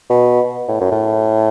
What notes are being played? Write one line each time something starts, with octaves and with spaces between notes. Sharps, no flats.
B2
A2
F#2
A2